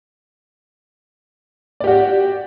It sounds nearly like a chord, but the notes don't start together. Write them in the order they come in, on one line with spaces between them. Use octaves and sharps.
D5 G4 F#4